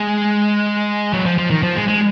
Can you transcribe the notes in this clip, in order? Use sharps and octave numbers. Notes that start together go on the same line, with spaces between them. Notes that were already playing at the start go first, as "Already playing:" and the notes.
Already playing: G#3
F#3
F3
F3
D#3
F3
G#3
G#3